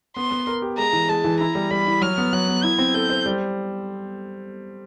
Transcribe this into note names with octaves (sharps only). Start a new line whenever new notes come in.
B3 C6
B3
A#4
G4
G#3 A#5
E3
G#3 A5
E3
E4 A#5
G3
G3 B5
E4
F#3 F6
B3
F#3 F#6
B3
E4 G#6
C4
A4 G6
C5
G3